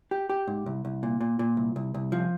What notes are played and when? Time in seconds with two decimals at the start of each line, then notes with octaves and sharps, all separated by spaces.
0.11 G4
0.30 G4
0.48 G#2
0.66 C2
0.85 C2
1.03 A#2
1.21 A#2
1.39 A#2
1.57 C2
1.76 C2
1.94 C2
2.12 F3